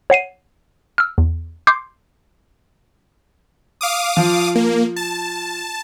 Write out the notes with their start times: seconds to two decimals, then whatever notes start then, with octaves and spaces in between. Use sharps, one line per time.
0.10 C#5 F#5 C7 D#7
0.98 E6 F6
1.18 E2
1.67 C6 D6 G6 C7
3.81 F5 D6 D#6
4.17 F3
4.55 A#3
4.96 A5